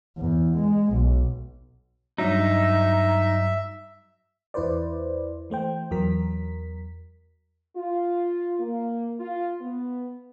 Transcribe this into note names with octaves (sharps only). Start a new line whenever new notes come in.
E2
G#3
B1
G2 F#3 D#4 E5
E2 E4 B4 C5 D5
E3 A3 C5 G5
E2 F#3 A#4 B6
F4
A#3
F4
B3